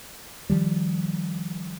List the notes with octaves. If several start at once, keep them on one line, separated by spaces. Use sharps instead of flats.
D#3 F3 G3